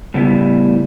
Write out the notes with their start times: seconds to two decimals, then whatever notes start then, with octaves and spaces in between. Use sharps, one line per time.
0.14 A2 C#3 G3 B3 E4